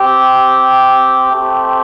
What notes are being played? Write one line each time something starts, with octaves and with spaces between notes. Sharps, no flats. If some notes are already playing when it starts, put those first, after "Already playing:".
Already playing: C4 G4
A3 C4 G4